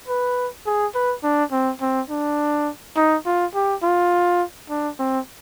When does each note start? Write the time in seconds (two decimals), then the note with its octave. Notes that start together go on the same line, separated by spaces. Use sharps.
0.08 B4
0.66 G#4
0.95 B4
1.23 D4
1.52 C4
1.81 C4
2.10 D4
2.96 D#4
3.26 F4
3.55 G4
3.83 F4
4.70 D4
4.99 C4